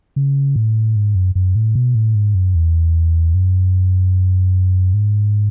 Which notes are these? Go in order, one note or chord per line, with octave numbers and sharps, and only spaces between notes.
C#3
A2
G#2
F#2
F#2
A2
B2
A2
G#2
F#2
E2
F#2
G#2